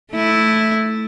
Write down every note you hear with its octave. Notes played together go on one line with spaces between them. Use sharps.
A3 E4